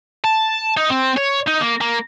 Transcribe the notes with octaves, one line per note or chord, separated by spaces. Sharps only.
A5
D#4
C4
C#5
D#4
A#3
A#3